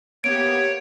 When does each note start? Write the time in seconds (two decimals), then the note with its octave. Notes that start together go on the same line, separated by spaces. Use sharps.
0.24 A#3 B3 G4 C#5 D7